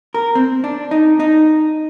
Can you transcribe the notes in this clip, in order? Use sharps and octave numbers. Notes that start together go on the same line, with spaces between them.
A#4
C4
D4
D#4
D#4